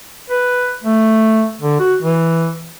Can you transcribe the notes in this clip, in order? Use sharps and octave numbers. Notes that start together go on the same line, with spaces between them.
B4
A3
D3
F#4
E3